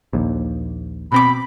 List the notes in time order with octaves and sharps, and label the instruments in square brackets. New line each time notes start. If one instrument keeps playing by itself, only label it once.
[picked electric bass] A#1 D#2
[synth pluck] B2 C4 D6 [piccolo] B5